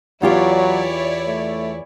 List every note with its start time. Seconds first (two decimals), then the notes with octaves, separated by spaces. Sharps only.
0.22 E2 F#3 E4 F4 G4 C#5 D5
1.27 A3